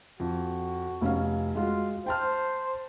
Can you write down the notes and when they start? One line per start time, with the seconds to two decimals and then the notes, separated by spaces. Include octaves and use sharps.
0.20 F2 F#4
1.01 F1 C#4 F5
1.55 G#3 F4 F#4
2.06 C5 G5 A5 F6